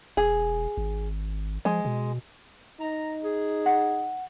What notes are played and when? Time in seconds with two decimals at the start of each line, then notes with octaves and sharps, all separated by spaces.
0.17 E1 G#4
0.77 G#1
1.65 F3 G#3
1.85 B2
2.81 D#4 A#5
3.23 G#4
3.66 F#5